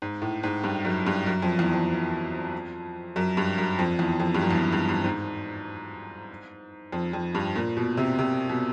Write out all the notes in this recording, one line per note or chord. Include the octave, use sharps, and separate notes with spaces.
G#2
A2
G#2
G2
F#2
G2
F#2
F2
E2
F2
F#2
G2
F#2
F2
E2
F2
G2
F#2
E2
F2
G2
G2
G#2
F2
F2
G2
A#2
B2
C3
C3
B2